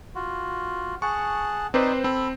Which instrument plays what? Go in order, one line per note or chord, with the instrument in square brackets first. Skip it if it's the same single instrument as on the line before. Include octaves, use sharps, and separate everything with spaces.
[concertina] F4 F#4
[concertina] G#4 F#5 A5 [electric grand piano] C#6
[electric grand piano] C4 B4 C5 [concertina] D#4 D5
[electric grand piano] C4 [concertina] A4 B5